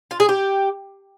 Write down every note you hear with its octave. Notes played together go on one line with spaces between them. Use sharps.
F4
G#4
G4